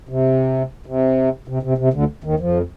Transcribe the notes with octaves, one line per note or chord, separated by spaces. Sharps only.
C3
C3
C3
C3
C3
D2 D3
D#2 D#3
F2 F3